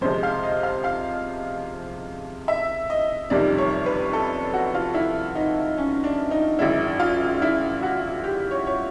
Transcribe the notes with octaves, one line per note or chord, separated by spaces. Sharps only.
F2 C3 F3 G#3 C5
F5
D#5
F5
F5
E5
D#5
F#1 F2 C3 D#3 G3 D5
C#5
B4
A4
F#4
F4
E4
D#4
C#4
D4
D#4
G#1 F#2 C#3 E4
F4
E4
F#4
G4
C#5
C#5